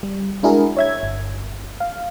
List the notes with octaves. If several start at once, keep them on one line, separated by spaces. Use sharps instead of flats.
G3
G#3 D4 E4 F#4 G#4 A#4
C#5 E5 G#6
G1
F5